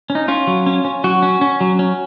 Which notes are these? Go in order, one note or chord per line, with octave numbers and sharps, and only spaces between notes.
C#4
D#4
C#4 F4
F#3
C#4
C#4
F#3 F#4
C#4
C#4
F#3
C#4